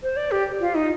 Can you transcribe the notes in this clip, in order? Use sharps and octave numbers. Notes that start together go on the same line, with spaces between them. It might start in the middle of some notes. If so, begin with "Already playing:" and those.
C5
D5
G4
F4
D#4